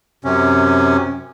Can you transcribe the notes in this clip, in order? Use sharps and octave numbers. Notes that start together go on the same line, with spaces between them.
F#2 C3 C#4